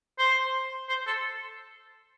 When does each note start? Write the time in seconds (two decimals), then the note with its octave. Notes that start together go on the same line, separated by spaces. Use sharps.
0.19 C5
0.89 C5
1.07 A4